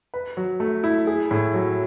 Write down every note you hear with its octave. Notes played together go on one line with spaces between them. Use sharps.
B4
F#3
A3
E4
G#4
A2
F#3